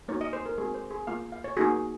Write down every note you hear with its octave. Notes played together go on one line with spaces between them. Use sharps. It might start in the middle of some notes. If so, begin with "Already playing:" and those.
A#3 D#4 F#4 C#5
D#5
C5
A#4
G#3 C4 F#4 G#4
C5
G#4
A#3 F4 F5
F5
C#5
A#3 D#4 F#4 G#4